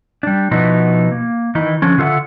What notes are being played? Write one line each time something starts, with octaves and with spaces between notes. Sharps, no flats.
G3 D4
B2 F3 B3 D#4 E4 F#4
A#3
D#3 E3 D#4 E4
D3 F3 C#4
D3 F4 A4 C5 E5 F#5